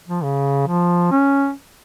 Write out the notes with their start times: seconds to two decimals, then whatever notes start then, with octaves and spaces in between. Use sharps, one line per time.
0.08 F3
0.23 C#3
0.68 F3
1.12 C#4